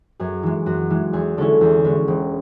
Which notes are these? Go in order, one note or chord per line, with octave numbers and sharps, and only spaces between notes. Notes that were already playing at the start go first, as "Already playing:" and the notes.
F#2 G#4
E3 G#3
F#2 F#4
E3 G#3
E2 G#4
D3 G#3 C#4 E4 A4
E2
D3 G#3 C#4 E4
E1